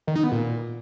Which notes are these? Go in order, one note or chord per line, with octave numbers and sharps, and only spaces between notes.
D#3
D#4
B3
A#2